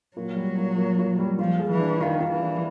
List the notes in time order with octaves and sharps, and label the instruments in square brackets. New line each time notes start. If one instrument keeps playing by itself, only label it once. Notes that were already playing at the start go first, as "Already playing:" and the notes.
[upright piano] A#2 [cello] F#3
[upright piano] G3
A#2
A#2
A#2
G3
[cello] F3 [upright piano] F4
[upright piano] G#4
[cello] E3
[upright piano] D4
[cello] D#3 [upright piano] F4
[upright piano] F4
[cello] E3
[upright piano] D4